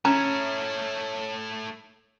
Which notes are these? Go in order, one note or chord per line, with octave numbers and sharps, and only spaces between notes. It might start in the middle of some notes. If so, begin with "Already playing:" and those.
A3 C#4 E4 A#5